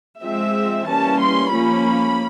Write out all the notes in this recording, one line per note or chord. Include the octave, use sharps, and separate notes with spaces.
F3 G#3 C4 E5
E3 G3 A#3 C#4 A5
C6
F3 A#3 C#4 B5